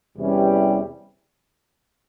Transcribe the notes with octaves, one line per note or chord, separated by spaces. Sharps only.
E2 C3 E3 G3 C#4